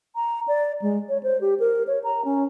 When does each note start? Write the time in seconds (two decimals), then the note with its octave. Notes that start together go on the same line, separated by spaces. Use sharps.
0.16 A#5
0.48 D5
0.82 G#3
1.09 C#5
1.23 C5
1.41 G4
1.60 A#4
1.87 C#5
2.04 A#5
2.25 C#4